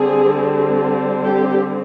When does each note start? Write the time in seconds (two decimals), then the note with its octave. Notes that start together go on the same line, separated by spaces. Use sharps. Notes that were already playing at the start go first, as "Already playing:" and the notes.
Already playing: D3 G3 C4 G#4
1.23 G4